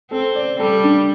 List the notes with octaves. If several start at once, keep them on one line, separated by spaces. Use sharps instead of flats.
C4 A4
D5
G3 A4
D4